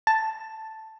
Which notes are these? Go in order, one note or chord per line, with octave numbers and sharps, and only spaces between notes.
A5